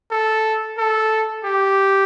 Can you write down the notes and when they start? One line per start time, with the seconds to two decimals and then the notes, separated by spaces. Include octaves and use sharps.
0.11 A4
0.78 A4
1.44 G4